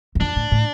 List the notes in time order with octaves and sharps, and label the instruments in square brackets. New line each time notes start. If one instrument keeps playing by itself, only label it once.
[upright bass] E2
[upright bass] F2 [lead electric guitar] D4
[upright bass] A2
A2